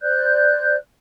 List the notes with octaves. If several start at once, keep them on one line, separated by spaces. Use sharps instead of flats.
C5 D5 F#6 G6